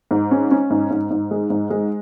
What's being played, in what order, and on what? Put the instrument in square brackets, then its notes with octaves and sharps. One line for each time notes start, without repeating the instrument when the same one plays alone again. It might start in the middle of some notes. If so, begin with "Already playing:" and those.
[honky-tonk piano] G#2
C#4
C#4
G#2
G#2
G#2
G#3
G#2
G#3